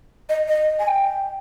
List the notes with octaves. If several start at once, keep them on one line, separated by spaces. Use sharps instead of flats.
D#5
D#5
G#5
G5